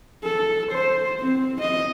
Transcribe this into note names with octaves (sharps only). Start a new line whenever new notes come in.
A4
C5
C4
D#5